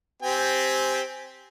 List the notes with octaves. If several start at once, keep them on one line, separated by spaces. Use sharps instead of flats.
C4 G4 G#5